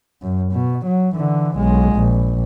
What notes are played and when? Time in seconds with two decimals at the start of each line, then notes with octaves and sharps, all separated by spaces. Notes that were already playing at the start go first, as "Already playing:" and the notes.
0.22 F#2
0.53 B2
0.86 F#3
1.15 D3 E3
1.58 B1 G#3
1.95 A#1